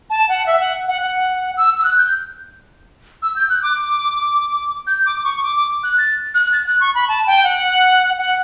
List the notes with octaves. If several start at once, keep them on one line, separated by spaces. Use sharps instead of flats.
A5
F#5
E5
F#5
F#5
F#5
E6
E6
F#6
G6
E6
G6
F#6
D6
G6
D6
C#6
D6
D6
F#6
A6
F#6
A6
F#6
C#6
B5
A5
G5
F#5
F#5